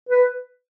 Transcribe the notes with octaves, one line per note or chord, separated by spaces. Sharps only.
B4